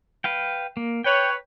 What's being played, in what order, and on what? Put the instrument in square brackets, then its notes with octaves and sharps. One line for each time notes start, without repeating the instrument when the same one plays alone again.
[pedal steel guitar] B4 F5 G5
A#3
[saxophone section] B4 C#5 [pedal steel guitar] G5